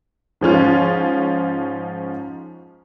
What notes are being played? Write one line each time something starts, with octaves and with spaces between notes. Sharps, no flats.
G#2 F3 C#4 F4